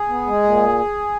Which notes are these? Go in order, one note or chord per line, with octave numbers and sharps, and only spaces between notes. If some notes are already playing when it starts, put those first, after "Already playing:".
Already playing: G#4
B3
G#3
A#2